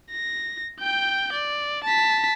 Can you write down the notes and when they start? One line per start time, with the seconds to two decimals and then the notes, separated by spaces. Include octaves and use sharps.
0.12 A#6
0.80 G5 G6
1.33 D5
1.84 A5 B6